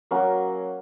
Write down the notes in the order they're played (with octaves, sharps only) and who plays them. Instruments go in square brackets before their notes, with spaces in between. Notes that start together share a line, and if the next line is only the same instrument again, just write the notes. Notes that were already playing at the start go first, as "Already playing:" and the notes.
[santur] F#3 A#3 C#4 F#4